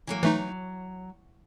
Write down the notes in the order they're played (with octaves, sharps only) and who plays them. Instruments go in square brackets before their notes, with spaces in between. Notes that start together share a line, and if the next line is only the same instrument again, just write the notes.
[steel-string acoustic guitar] E3 F#3 A#3
[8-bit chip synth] E3 A3 D#4 [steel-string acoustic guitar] F#3